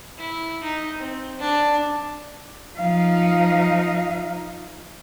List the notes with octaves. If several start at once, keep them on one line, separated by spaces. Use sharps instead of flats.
E4
D#4
C4
D4
F3 D#4 F5